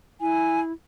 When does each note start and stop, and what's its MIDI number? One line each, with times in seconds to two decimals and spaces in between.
0.21 0.72 64
0.21 0.60 80